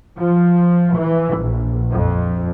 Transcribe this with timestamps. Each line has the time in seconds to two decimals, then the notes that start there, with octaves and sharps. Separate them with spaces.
0.20 F3
0.96 E3
1.38 A#1
1.92 F2